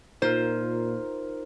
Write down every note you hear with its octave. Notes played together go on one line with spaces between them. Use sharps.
A#2 D#4 F4 A#4 C5